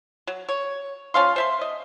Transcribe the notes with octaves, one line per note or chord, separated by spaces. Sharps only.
F#3
C#5
F3 C#4 F5 C6
C5 E5 C6
D#5